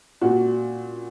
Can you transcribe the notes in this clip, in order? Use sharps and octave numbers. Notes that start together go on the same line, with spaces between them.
A#2 F#4